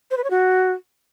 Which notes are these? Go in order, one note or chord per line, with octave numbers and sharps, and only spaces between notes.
C5
B4
C#5
F#4